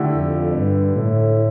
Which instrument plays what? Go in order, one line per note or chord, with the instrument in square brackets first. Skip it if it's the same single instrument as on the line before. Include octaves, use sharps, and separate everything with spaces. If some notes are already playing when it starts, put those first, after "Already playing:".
Already playing: [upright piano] D3 A3 E4 G4
[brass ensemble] F2
G2
A2